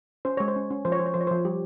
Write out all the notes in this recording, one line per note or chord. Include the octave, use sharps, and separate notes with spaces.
C#4 C5
G#3 C#5
C5
C#4
C#4
F3 C5
C#5
F3 C5
C#5
F3 C5
C#5
F3 C5
G3 G4